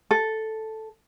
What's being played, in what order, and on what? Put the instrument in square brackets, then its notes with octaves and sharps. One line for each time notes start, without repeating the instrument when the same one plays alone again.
[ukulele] A4